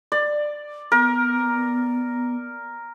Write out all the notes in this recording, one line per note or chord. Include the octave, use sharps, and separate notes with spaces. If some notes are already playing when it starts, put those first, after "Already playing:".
D5
B3 A#4